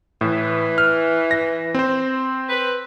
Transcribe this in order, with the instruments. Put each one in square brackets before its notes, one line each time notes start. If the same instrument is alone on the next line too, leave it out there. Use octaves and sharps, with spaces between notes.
[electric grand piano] A2 [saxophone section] E3
[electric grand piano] F6
A#6
C4 C5
[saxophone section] B4